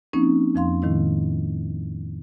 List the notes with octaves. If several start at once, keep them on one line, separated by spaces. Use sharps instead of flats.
F3 A#3 C4 C#4 D#4
F2 F3 F5 C6
A2 D#3 G#3 E4